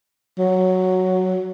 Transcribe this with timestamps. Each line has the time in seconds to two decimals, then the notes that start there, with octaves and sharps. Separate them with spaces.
0.39 F#3